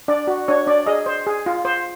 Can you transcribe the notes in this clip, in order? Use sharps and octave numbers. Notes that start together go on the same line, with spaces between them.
D4 D5
F#4
D4 C#5
D4 D5
G#4 D#5
C5
G#4
F4
C5